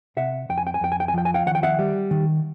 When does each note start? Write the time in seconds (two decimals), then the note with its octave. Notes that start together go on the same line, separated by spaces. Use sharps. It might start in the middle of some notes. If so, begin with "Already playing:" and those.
0.17 C3 E5 F#5
0.49 F2 G5
0.58 G#5
0.67 G5
0.74 G#5
0.81 F2 G5
0.92 G#5
1.00 G5
1.08 G#5
1.14 F3 G5
1.25 G#5
1.34 F5 G5
1.46 D#3 F#5
1.55 G5
1.63 E5 F#5
1.79 G3
2.11 D#3